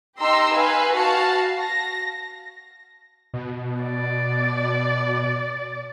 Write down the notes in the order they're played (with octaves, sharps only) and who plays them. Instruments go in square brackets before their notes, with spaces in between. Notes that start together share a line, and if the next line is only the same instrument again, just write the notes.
[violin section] D#4 G4 A#5 C6 E6
B4 F5 G#5
F#4 F5 A5
A#6
[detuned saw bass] B2
[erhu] D5